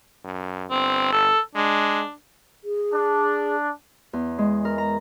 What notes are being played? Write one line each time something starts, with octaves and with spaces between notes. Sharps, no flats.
F#2
G1 C4
A4
G#3 D4
G#4
D4
E2
G#3
A#4
A#5